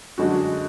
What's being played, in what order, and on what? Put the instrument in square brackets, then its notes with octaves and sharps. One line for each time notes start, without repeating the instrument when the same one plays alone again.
[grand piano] F#2 D3 G#3 D4 F#4